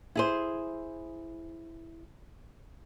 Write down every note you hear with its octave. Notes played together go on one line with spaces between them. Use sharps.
E4 G#4 C5